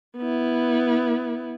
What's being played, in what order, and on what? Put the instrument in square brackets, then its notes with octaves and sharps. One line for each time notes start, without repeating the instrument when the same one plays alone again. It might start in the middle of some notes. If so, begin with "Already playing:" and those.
[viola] B3 E4